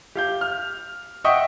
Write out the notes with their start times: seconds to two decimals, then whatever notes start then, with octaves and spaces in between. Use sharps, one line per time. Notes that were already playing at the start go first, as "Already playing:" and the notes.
0.15 G4 F5 G6
0.41 F6
1.24 D#5 E5 F#5 G5 C#6 D#6